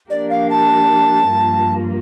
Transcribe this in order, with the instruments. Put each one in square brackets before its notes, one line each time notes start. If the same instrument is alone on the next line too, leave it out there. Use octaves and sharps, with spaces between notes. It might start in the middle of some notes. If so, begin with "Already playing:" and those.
[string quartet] F3 A#3 D4 G4 A#4 [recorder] D5
[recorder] F5
A5
[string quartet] G2 F3 A#3 F4